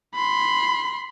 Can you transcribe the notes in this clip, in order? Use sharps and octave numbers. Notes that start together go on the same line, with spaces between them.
B5 C6